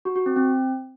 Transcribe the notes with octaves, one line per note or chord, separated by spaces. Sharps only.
F#4
F#4
C4
C4